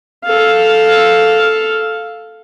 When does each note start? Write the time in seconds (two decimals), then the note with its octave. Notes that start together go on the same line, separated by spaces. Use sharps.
0.24 A4 F5